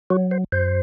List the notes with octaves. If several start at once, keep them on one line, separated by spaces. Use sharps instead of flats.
F#3 F#4
C5
F#2 C5